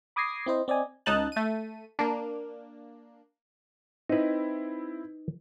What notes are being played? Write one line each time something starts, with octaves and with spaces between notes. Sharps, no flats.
B5 D6 D#6 G#6 A#6 C7
C4 E4 C5 D#5
C4 D5 D#5 G#5
C#2 D#4 A5 F#6
A3 D#7
A#3 D4
C4 D#4 E4 B4